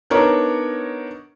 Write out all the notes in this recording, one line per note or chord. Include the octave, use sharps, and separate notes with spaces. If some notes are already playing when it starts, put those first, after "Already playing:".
B3 D4 D#4 A#4 C#5